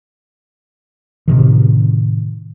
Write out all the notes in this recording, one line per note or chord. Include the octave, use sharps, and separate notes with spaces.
A2 C3 D#3